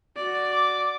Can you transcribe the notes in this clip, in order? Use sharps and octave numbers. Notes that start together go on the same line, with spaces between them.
F#4 D5
D6